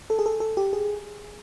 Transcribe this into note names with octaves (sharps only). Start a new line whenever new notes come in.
A4
G#4
A4
A4
G4
G#4